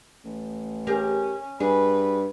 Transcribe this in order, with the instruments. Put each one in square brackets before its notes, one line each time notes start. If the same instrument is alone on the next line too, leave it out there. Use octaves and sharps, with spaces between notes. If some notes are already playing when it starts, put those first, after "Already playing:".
[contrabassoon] A1
[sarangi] C#4 [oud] G4 G#4 A#4
[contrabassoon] G2 [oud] G#4 [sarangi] B4